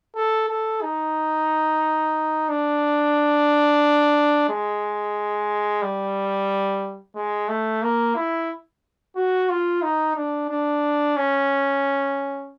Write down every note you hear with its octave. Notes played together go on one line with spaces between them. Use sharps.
A4
A4
D#4
D4
G#3
G3
G#3
A3
A#3
E4
F#4
F4
D#4
D4
D4
C#4